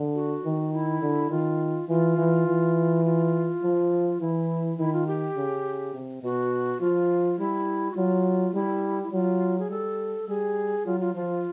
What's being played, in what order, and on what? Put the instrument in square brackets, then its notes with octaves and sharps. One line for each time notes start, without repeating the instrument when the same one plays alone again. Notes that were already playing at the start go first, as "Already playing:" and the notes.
Already playing: [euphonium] D3
[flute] F#4
[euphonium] D#3
[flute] E4
[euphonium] D3
[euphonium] D#3 [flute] F4
[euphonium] E3 [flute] F4
[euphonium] E3
E3
[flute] F4
[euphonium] F3
[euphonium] E3 [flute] E4
[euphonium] D#3 [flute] E4
[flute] F4
G4
[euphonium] C#3
C3
[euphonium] B2 [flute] F#4
[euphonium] F3 [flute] F4
[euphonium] G3 [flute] E4
[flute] F#4
[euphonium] F#3 [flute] F4
[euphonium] G3 [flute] E4
[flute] E4
[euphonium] F#3 [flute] F4
[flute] G#4
[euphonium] G3 [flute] A4
[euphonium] G3 [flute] G#4
[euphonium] F#3 [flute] F4
[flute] F4
[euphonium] F3 [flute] F4